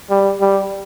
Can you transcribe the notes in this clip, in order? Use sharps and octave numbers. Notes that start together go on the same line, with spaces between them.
G3
G3